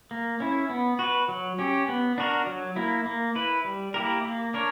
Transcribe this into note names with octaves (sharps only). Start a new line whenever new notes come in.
A#3
C#4 E4
B3
F#4 B4
F#3
C#4 G4
B3
D4 F#4 A#4
F#3
A#3 E4
A#3
E4 B4
G3
A#3 E4 G4 A#4
A#3
D4 A#4 C#5